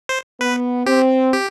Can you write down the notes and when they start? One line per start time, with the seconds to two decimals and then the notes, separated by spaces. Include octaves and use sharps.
0.09 C5
0.41 B3 B4
0.86 C4 G4
1.33 G4